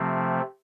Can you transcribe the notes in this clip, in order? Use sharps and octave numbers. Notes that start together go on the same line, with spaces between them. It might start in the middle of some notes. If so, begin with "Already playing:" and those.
Already playing: C3 F3 A3 C4